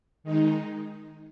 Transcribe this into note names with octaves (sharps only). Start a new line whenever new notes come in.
D#3 G#3 D#4